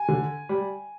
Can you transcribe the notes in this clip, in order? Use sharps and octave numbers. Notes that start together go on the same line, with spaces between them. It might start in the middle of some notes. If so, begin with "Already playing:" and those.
Already playing: G#5
D3
G3